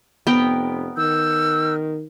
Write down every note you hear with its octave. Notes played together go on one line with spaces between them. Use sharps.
F1 B3 A#4 G5
D#3 E6 F6 G6